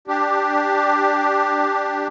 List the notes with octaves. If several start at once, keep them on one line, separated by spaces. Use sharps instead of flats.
D4 G4